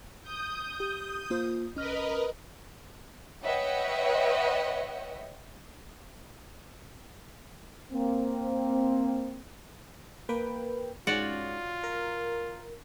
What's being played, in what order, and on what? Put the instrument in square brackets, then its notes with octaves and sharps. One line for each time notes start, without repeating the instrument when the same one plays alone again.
[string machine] D#6 G6
[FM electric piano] G4
A#3 F4 C5
[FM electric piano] C2 C#4 F6 [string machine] A#4 B4 D#5
[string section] B4 C#5 D#5 E5 F#5 G5
[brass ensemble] A#3 C4
[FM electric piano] A#3 B4 G5
[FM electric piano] G#2 C#4 [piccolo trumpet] F4 [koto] F#4 C#5 D5
[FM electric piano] A#4